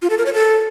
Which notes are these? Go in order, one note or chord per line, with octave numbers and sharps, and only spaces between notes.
F4
A4
A#4
C#5
A4